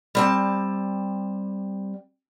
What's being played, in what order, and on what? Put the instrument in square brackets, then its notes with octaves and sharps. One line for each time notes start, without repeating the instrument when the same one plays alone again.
[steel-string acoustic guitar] G3 C4 A5